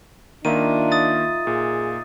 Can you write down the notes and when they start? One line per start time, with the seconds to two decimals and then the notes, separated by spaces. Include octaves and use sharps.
0.45 D#3 A#3 D4 D#4 F4 E5 D#7
0.92 D#6 A6
1.47 A#2 G#4